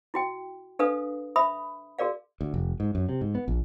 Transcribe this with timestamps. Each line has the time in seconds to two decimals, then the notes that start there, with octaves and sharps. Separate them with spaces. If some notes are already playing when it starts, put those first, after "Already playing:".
0.14 E4 F#4 G5
0.79 D4 A4 B4 F5 D#6
1.36 E5 B5 D#6
1.99 F#4 G#4 A#4 D5 F5
2.41 D2
2.54 F1
2.80 G#2
2.95 F#2
3.09 C3
3.21 G#2
3.35 B3
3.48 A#1